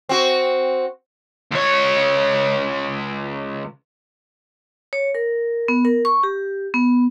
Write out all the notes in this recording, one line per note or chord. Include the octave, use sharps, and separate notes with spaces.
C4 F#4
C#2 C#5
C#5
A#4
B3
A#4
C#6
G4
B3